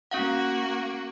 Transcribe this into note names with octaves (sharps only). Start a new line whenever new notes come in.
A#3 C#4 F#4 F5 F#5